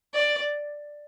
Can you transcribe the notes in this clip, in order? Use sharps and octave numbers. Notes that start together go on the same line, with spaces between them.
D5